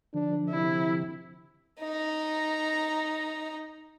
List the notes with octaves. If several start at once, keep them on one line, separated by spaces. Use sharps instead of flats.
D3 F3 D4
C3 E4
D#4 A#5